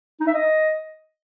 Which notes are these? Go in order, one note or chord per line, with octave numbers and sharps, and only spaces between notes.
D#4
E5
D#5